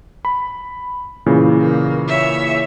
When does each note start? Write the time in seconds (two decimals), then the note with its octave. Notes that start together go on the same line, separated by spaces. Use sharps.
0.25 B5
1.26 A#2 C#3 E3
1.60 A#3
2.08 C#5 E5